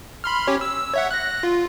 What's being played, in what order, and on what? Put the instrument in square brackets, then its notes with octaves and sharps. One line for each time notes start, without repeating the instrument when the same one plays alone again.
[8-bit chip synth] B5 C6 F6
C#4 G4 C#5
E6
C#5 E5 F#5
F#6 A#6
F4